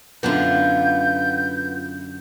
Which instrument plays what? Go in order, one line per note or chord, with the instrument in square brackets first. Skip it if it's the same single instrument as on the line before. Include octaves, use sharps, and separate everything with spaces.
[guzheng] F#2 D3 E4 [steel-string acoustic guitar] B3 F4 [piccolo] G6